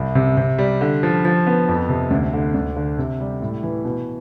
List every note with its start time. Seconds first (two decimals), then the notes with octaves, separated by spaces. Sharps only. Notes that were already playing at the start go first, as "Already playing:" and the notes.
Already playing: C2
0.15 C3
0.37 C3
0.58 G3
0.81 D3
1.03 F3
1.25 F3
1.47 B3
1.68 F2
1.89 C3
2.11 D2
2.33 D3
2.54 D2
2.76 D3
2.98 C3
3.20 G3
3.42 A2
3.63 E3
3.85 B2